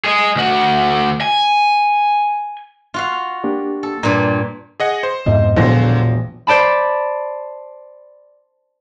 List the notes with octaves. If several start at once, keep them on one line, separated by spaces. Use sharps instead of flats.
G#4 D#5
D2 F#4
G#5
F4 F#4 F5
A#3 D4 G4
A4
G2 A#2 A#5 C6
G#4 D#5 F#5
C5
F2 G#2 B2 D#5 E5
E1 A#1 A#2 D3 F3 F#3 C5 A#6
C5 D5 A5 B5